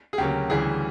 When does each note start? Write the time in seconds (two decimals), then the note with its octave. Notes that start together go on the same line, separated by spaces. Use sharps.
0.13 G#4
0.18 D2 C#3 F#3 A#3 G4
0.50 D2 C#3 E3 G3 G#4